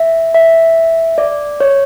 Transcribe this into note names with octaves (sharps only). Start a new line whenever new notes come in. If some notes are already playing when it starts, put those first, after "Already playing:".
Already playing: E5
E5
D5
C#5